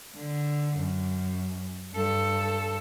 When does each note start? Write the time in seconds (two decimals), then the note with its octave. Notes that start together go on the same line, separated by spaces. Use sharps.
0.16 D3
0.76 F#2
1.94 G2 A4